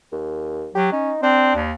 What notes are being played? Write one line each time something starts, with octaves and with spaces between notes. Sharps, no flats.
D#2
F#3 G4
C#4 D#4
C4 D4
D#2